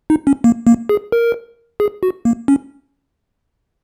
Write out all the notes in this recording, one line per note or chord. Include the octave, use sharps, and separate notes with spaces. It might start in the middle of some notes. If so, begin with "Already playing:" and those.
D#4
C#4
A#3
A#3
G#4
A#4
G#4
F#4
A#3
C#4